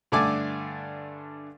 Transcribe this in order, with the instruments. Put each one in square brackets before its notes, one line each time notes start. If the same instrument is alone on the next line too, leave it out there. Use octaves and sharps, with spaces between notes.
[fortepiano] G2 D3 A3 D5 G#5 D6